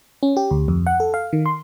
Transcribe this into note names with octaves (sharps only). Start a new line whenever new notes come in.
C#4
G4
D2
F2
F#5
A4
F5
D#3
C6